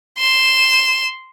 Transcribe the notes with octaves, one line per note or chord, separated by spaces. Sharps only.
C6 E7